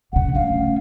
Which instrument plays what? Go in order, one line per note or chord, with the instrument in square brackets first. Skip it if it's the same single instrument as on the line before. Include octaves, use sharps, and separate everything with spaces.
[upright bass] F#1 C#3 [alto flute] F#5
[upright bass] A3 C#4 [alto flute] F5